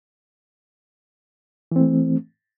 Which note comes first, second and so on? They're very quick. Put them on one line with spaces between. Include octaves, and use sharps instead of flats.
E3 C4 A3